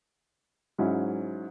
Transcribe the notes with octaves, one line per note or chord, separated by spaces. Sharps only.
G#2 F#3 C#4 E4